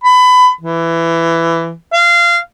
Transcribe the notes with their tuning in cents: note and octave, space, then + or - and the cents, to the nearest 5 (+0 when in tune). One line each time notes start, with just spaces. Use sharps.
B5 +25
E3 +15
F5 -20